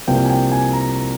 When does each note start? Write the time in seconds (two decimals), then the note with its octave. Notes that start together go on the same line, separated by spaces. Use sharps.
0.07 C2 C3 F3 A#3 G5
0.25 G#5
0.30 G5
0.52 G#5
0.73 A#5